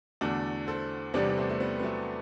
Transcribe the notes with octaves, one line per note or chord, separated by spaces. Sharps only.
E2 D3 A3 D4 F#4
A4 C5
E2 C3 G3 B3 D4
D4
A3 C4
A3
G3 B3
B3
F#3 A3